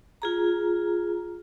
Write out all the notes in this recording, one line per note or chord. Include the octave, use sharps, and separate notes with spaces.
F4 G#4 A#5